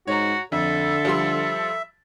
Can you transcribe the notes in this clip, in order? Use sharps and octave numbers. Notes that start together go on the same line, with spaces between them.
G#2 F#4 C#5 A#5
F2 D3 A4 E5
F3 G3 C6